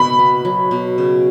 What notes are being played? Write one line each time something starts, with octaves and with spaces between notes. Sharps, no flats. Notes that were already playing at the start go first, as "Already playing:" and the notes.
Already playing: B2 B5
B3
F#3
B2
C#3